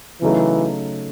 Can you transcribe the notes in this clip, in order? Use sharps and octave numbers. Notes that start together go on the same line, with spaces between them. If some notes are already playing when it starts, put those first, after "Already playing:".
C#3 E3 F#3 A3 D#4